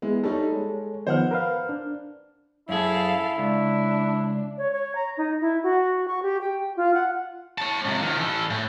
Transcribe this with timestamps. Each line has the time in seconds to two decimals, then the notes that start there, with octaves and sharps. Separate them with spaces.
0.02 G#3 B3 E4
0.24 G3 D#4 A4 C#5
0.52 G#3
1.07 D#3 F3 B3 C5 F#5 F6
1.31 A#4 B4 F5
1.69 D4
2.69 F#2 E4 G#4 A4 F5
3.38 C#2 D4
4.58 C#5
4.72 C#5
4.95 A#5
5.17 D#4
5.41 E4
5.63 F#4
6.08 C#6
6.22 G4
6.41 G5
6.77 F4
6.94 F#5
7.58 C#5 A5
7.85 C#2 C3
8.01 D#3 F3
8.18 E3 A4
8.50 A2